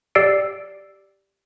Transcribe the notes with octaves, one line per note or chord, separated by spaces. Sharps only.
G4 D5 E6 C7 D7